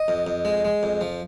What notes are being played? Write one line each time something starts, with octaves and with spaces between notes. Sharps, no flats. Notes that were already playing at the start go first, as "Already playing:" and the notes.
Already playing: D#5
F2
F2
G#3
G#3
F2
F3